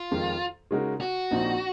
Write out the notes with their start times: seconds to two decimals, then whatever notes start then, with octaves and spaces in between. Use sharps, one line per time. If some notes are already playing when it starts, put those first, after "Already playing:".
Already playing: F4
0.11 F2 D#3 G#3
0.71 C#3 G#3 D#4 F#4 A#4
1.01 F#4
1.31 A#1 A#2 F3 C4 D#4